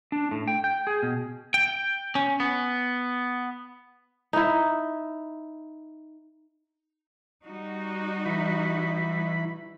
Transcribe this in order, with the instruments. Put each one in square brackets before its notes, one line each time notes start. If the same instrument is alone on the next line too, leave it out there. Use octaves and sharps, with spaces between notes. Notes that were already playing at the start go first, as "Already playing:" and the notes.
[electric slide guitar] D4
A2
G5
G5
G#4
B2
[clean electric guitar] G5
C#4
B3
[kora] D#4 E4
[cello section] G3 D#4 F#4
[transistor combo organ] E3 E4 B5